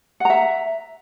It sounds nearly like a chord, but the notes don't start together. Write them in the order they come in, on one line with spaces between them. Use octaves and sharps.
F#5 A#5 E5